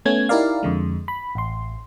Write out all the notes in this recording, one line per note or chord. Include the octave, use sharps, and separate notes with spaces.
A3 B3 C#4 G#6
D#4 E4 G4 A#4 D5 F5
F2 D3 G#3
B5
A1 C6